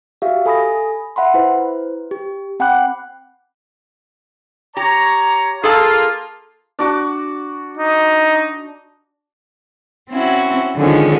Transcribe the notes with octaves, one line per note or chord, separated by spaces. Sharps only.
F#4 G4 E5 F5
A4 G#5 B5 D#6 A#6
E5 F#5 B5 C6
E4 B4 C5
G4
C4 F#5 G5 B5 D6 F#6
G4 C#5 A#5
A#3 F4 G#4 A4 A5
D4 F#4 D6
D#4
C4 C#4 E4 F#4
D3 D#3 F3 G#3 C#4